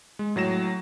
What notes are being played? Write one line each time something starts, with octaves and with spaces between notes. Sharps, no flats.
G#3
A2 F#3 A#6 E7